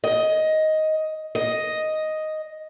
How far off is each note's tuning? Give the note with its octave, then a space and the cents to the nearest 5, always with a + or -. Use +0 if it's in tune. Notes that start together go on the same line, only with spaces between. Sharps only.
D#5 +10
D#5 +5